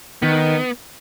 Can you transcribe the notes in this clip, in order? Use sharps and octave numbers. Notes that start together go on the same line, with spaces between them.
D#3 B3